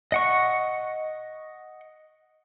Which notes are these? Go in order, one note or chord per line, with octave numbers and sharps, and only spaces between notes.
D#5 F#5 C#6